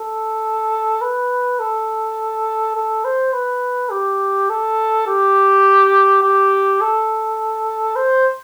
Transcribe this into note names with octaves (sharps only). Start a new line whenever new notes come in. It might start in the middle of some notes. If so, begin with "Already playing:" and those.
Already playing: A4
B4
A4
A4
C5
B4
G4
A4
G4
G4
A4
C5